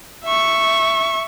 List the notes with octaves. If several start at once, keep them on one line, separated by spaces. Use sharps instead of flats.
E5 C#6